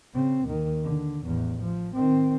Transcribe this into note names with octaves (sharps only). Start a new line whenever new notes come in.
C#3 C4
D#2 D#3
D3
A1 E2
F3
D#3 C4